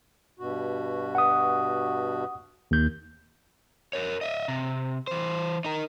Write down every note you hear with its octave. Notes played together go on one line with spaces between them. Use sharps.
G2 B2 F#4
F#5 D#6
D#2 G6
A#4 C#5
D#5 E5
C3
E3 C5
D#4 A#4